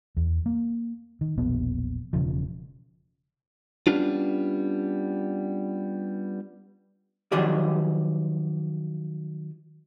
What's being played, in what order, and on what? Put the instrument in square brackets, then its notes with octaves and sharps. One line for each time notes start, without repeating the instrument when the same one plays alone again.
[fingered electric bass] E2
A#3
D#3
E1 A#1 B2 B3
E1 C#2 C#3 F3
[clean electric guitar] G3 B3 C#4 D4 F4
[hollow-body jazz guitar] D#3 F3 F#3 G4 G#4 D5